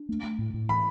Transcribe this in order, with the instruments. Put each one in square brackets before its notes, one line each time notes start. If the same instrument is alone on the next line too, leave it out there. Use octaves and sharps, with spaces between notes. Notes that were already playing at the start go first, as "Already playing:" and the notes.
Already playing: [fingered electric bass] D4
A3
A3
A2
A2
[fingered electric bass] E3 [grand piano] B5